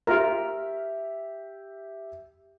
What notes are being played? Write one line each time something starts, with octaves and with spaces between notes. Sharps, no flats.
F4 G4 A#4 E5